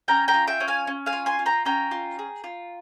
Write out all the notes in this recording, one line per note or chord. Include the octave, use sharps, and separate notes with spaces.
C#4 G5 A#5
G5 A#5
F4
E5 G5
C#4
F5 G#5
C#4
F5 G#5
F4
G#5 C6
F4
G5 A#5
C#4 G5 A#5
F4
G#4
F4